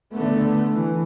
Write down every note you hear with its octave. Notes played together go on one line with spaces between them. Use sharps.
D3 A3 B3
E3